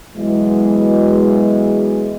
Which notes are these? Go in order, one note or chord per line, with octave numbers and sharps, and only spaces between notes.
B2 E3 F#3 G#3